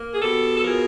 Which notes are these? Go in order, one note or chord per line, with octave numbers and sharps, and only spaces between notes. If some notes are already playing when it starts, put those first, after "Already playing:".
Already playing: A#3
G#4
B2 G4 A4
A4
F3 G#4 A#4